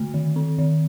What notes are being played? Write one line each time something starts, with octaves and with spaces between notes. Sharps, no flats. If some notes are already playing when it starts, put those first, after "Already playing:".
Already playing: D3 A3
D#3
C4
D#3